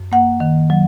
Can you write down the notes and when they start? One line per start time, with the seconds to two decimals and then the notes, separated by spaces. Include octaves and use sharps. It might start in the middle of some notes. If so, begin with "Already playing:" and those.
Already playing: F#2
0.12 A#3 F#5
0.40 D#3
0.70 F#3